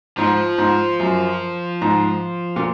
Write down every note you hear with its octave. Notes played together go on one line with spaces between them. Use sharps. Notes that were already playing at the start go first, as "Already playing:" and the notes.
G#2 F3
G#2
F#2
G#2
A#2